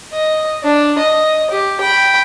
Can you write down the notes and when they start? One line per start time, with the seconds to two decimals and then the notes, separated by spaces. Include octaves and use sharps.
0.13 D#5
0.64 D4
0.98 D#5
1.50 G4
1.81 G5 B5